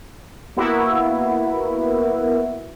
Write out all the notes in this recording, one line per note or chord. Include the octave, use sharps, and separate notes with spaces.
A#3 B3 E4 F#4